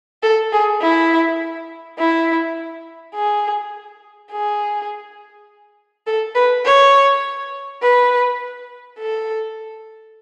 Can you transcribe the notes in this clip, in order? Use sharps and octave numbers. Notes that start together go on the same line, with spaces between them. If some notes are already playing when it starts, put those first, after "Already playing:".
A4
G#4
E4
E4
G#4
G#4
A4
B4
C#5
B4
A4